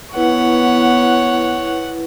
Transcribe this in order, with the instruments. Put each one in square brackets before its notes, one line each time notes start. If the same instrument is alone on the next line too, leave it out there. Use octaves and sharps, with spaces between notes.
[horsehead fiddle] B3 [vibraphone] E4 B4 [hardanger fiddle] C#5 [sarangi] F#5